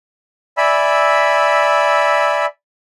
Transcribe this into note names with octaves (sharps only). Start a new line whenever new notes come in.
D5 E5 G#5 B5 E6